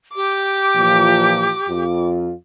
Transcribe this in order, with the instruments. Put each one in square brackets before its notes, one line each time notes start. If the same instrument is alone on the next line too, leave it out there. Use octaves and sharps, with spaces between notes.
[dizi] G4 [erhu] D6
[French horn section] A#2 E3 F3
F2 F4